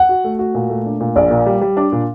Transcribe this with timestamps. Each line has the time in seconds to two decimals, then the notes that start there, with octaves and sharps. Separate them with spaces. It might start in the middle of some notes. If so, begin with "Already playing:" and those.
Already playing: F#5
0.09 F#4
0.24 A3
0.39 F#4
0.55 A#2
0.70 A3
0.86 D4
1.00 A#2
1.16 A#1 D5
1.31 A#2
1.46 G3
1.61 G3
1.77 D4
1.92 A#2